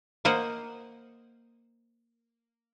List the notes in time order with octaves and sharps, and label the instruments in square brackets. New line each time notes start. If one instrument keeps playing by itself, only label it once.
[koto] A#3 A#4 C5 D#5 F#5